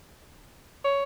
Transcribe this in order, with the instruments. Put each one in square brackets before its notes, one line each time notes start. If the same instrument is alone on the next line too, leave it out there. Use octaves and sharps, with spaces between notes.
[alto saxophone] C#5